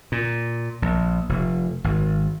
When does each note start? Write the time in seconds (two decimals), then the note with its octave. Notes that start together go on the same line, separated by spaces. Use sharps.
0.12 A#2
0.82 A#1
1.29 F1
1.84 G#1